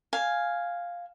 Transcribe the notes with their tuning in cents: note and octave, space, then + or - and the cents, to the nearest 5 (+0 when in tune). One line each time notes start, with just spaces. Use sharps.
F5 +0 G#5 +0